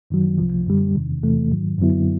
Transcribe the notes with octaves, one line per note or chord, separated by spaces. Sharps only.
F#2 D#3 F#3
C2 C3 F3
F#2 D3 G3
E2 C3 D#3
E2 C3 E3 A3
G#2 D#3 F#3
F#2 D3 F#3 B3 E4